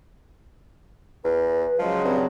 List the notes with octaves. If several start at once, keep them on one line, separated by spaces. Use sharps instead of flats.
E2 B4
C#3 F3 F#3 G#3
G2 C4